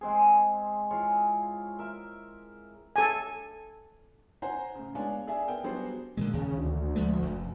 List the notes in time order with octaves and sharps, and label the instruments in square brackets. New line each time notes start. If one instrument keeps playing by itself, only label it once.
[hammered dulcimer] G#3 C4 G#4
E4 F4 G#4 C#5
A#4 E5
[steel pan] A4 G#5
[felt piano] C5 F#5 G#5 A#5
A2 C#3
G#3 B3 D4 C#5 F5 G#5
G#4 D5 E5 G#5
B3 A#4 G5
F#3 G3 B3 D4 G#4 C5
[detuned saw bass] A#2 [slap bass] D3 D#3 G#3
[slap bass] D#2 [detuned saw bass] C#3
[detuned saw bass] D2
[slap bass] F3 G#3 A3
F1 F#2